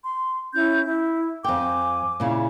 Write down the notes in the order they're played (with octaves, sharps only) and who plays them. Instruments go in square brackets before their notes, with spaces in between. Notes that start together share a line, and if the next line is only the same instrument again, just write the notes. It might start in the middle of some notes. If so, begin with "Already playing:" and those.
[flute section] C6
C#4 E4 G6
E4
[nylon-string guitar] F2 G5 [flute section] G#5 D6
[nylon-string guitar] A#2 C#3 E4